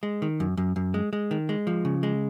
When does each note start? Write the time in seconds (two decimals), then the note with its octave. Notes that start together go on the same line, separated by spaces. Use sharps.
0.03 G#3
0.22 D#3
0.40 F#2
0.57 F#2
0.76 F#2
0.94 G#3
1.13 G#3
1.31 D#3
1.49 G#3
1.67 F3
1.85 C#3
2.03 G#3